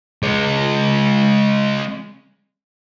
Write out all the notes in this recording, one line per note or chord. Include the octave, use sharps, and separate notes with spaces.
G#3 C#4